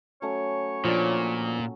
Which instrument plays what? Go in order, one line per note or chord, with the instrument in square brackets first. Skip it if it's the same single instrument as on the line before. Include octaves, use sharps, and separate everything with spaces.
[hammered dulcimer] F#3 A3 C#4 [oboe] C#5
[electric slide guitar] A#2 [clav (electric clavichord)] F3 D4